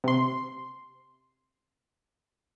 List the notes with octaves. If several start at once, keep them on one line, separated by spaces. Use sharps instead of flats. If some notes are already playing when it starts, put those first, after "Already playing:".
C3 C6